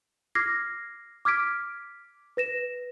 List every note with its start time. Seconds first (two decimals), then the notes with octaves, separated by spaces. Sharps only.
0.35 D6 F6 G#6 A#6 C7
1.25 D6 F6 G#6 B6 D7
2.37 B4 A#6 E7